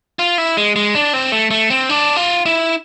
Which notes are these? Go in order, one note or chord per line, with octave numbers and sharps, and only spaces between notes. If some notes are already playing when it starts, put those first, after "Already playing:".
F4
E4
G#3
G#3
D4
C4
A3
A3
C4
D4
F4
E4